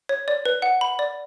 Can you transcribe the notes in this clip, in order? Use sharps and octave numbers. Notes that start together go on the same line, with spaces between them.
C#5
D5
B4
F#5
B5
D5